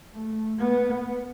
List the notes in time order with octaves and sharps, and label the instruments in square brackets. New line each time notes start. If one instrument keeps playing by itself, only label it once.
[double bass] A3
B3